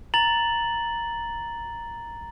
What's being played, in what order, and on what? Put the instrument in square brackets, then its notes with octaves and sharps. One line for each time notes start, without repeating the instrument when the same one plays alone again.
[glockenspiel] A#5 A6 F#7